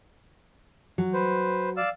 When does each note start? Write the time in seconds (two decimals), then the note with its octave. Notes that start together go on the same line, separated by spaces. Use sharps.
0.98 F#3
1.14 B4 C5
1.77 D5 F5 E6